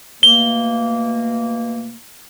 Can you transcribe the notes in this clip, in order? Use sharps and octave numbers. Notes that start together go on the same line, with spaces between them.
B2 A3 A#3 G7